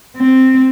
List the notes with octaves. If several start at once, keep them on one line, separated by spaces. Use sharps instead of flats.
C4